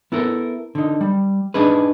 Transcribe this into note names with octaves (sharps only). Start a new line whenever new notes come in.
B3 E4 A4 A#4
D3 D#4
G3
D4 D#4 G#4 B4